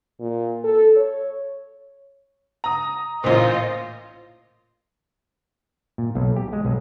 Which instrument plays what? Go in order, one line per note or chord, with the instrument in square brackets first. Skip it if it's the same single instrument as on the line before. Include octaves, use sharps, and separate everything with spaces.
[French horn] A#2
A4
C#5
[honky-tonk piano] A#5 D#6
[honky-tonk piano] A1 A#2 [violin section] F4 D#5 [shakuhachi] C5
[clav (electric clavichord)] A#2
B1
G4
G#3
B1